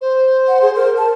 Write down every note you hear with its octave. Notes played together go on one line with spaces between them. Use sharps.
C5
F#5
G#4
A#4
A5